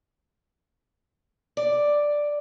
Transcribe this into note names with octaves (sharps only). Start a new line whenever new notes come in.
D5